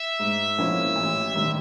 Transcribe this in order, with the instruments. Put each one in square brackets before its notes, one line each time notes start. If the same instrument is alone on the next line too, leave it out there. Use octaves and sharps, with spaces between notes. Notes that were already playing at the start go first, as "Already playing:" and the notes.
Already playing: [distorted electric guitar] E5
[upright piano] G#2
F3 A#3 C#4 E4
A1
G2 D#3 G3